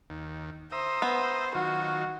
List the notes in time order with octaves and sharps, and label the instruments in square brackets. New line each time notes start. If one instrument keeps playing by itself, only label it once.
[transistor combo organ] D#2
[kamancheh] C5 [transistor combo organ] E5 A#5 D#6
[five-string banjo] B3
[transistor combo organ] D#3 F#3 F4 [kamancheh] F#4